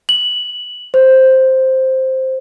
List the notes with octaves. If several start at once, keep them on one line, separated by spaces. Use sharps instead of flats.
F#7
C5